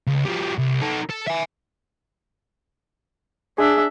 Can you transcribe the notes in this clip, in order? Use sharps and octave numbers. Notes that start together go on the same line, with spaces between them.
C#2
F3 G3
C2
D#4 A4
A4
E5 G#5
D4 G#4 E5